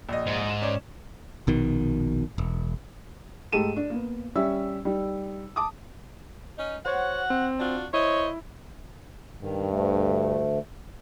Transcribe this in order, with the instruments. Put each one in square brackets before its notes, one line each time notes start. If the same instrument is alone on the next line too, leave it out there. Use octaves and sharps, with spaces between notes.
[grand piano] A#1 D#5
[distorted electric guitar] G#2
[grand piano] E7
C#4 D5
[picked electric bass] A#1 B2 D#3
E1
[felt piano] G#2 A3 G4 A4 D#7 E7
D4
A#3 B3
G3 C#4 E5 E6
G3 D#4
A5 D6 D#6
[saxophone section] C#4 D#4
[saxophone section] F#4 F#5 [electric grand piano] C5 C#5
[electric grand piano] C4
[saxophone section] D4 F4 F#4
[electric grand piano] E4 [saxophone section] C5 D#5 [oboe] C#5
[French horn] G2 [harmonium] D#3
[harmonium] D2 A3